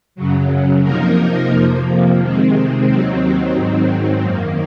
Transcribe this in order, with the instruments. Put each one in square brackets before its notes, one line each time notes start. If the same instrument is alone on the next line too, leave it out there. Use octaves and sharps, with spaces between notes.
[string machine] F#2 C#3 F#3
C3 F3 A#3 D#4 A#4
F2 C3 F3 A#3
C3 D#3 G#3 C4
D#2 D#3 F#3 C4
G#2 D#3 F#3 C4
F#2 D#3 A#3